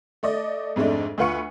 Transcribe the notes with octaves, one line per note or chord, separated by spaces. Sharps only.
A3 D5 D#5
F2 G#2 G#3 A3 D4
D2 F4 B4 F#5 C#6 C#7